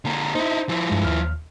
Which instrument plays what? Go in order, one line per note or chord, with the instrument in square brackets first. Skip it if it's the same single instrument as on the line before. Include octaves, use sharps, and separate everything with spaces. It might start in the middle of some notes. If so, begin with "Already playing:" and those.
[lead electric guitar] D3 A#3
[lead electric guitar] D#4 E4 [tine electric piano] C5
[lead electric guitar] F3 E4
[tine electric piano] G2 G#3
D#2 F6